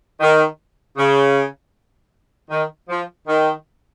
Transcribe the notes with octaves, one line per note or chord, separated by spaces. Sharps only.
D#3
C#3
D#3
F3
D#3